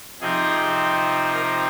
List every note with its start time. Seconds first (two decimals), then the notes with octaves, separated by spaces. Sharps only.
0.21 C3 F3 C4 D#4 G#4
1.33 A#4